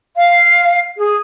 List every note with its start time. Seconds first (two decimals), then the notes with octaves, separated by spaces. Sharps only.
0.16 F5
0.97 G#4